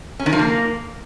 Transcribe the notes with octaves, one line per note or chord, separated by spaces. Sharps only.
C#4
D#3
F3
A#3